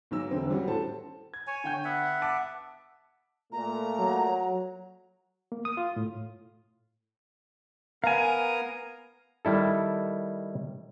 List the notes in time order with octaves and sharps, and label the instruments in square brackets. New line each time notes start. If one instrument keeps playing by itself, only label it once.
[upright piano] B1 G#2 F#3 E6
E1 D3 C4
G3 C#4 F#4
A2 A4 C5 A5
[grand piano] G#6
[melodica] C#5 G#5
[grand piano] D3 G5 G6
[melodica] B3 E5 F#5
[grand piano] A5 D6
[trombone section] A#2 A3 [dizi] A#5
[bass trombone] F#3
[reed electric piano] A#3
D#6
F4
A2
[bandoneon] B3 A#4 A#5 [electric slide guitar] F5 G#5
[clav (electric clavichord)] D#3 G3 E4 A4